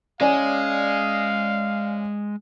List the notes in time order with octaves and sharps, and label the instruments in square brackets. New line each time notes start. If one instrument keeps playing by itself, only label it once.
[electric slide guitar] G#3 [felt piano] C#4 D5 G#5 [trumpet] F5